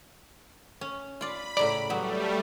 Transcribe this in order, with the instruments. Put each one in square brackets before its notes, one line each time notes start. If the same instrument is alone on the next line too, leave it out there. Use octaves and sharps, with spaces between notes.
[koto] C#4
[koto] F4 D5 [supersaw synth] B5
[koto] A2 C#3 A#5 [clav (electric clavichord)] D5
[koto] F#3 B3 [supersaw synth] G3 A3